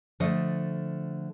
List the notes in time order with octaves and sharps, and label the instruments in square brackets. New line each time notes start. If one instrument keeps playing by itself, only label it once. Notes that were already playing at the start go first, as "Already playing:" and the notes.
[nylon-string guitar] D3 F3 A3 A4 D#5